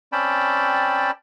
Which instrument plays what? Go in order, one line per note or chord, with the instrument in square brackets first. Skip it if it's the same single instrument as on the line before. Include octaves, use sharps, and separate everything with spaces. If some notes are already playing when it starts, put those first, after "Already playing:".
[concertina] C4 C#4 D5 G5 A5 B5